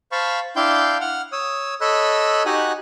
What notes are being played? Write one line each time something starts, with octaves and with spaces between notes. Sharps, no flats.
C5 F5 A5 B5 C#6
D4 E4 F5 G5 C6 G6
F#5 F6
C#5 D#6 E6
A4 C#5 D#5 B5 E6 F#6
D#4 F#4 G4 F#5 G#5 F#6